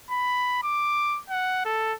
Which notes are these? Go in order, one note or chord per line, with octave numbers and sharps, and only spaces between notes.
B5
D6
F#5
A4